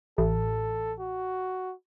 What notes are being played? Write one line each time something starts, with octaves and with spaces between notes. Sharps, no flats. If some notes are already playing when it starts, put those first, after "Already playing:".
A1 A4
F#4